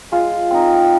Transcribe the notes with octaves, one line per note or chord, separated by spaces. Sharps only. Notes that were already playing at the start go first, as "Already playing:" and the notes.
G#3 F4
C4 D#4